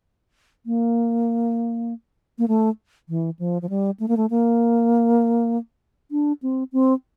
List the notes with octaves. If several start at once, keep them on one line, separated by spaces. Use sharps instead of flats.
A#3
A#3
A3
E3
F3
F3
G3
A3
A#3
A3
A#3
D4
C4
C4